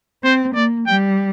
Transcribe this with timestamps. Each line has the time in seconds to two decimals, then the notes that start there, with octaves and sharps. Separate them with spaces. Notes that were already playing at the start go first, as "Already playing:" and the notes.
0.23 C4 C5
0.55 A#3 D5
0.87 G3 G5